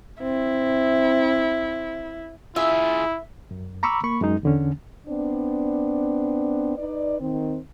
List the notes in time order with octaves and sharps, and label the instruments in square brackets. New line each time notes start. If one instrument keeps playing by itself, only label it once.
[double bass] C4 [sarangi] E4
[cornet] E4 [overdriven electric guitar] F4 G#4 [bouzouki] E5
[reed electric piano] F#2
A#5 B5 C#6 D6 E6
A#3 B5 C#6
F#2 G#3 D#4
E2 D3 C#4
[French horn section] B3 C4 D4
D#4 B4 D5
D#3 C4